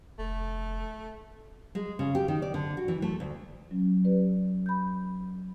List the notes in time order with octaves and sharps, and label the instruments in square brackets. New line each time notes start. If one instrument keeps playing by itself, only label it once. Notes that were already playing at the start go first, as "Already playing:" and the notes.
[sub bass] F1 [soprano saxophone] A3
[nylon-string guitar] G#3
C#3
G4
D#3
D5
D3
F#4
E3
A3
D2
[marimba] F#3 C#4
C#4 G4 B4 D5
B5 G6